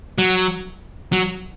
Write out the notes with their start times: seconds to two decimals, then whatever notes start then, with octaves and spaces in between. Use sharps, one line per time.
0.18 F#3
1.12 F#3